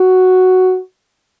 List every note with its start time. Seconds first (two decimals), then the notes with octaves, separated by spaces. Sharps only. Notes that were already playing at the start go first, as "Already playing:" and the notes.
Already playing: F#4